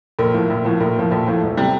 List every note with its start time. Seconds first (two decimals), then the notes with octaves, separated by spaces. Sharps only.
0.19 A#1 A#4
0.34 A2 F3
0.50 A#1
0.65 A2 F3
0.80 A#1 A#4
0.96 A2 F3
1.11 A#1 A4
1.27 A2 F3
1.42 E1
1.57 C3 G3